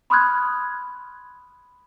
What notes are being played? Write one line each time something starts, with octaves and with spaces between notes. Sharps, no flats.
B5 C6 D#6 F6 F#6 G#6